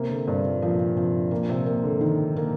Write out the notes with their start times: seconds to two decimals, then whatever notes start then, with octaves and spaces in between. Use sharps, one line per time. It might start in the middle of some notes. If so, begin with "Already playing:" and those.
Already playing: C3 A#3
0.09 D3
0.27 G2 C3
0.45 A#2
0.62 A#2 F3
0.96 C3 F3
1.31 A#2 A#3
1.49 C3
1.66 A#3
1.83 D3
2.01 D#3
2.37 A#3